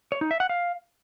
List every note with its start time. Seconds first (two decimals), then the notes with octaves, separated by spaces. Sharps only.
0.12 C#5
0.21 D#4
0.31 E5
0.40 F#5
0.49 F5